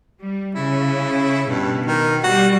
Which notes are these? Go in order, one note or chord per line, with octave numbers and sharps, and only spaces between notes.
G3
C#3 E4
G2 B2
D#3
G3 F#4